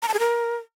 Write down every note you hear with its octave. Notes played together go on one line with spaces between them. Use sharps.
A#5
A5
G#4
A#4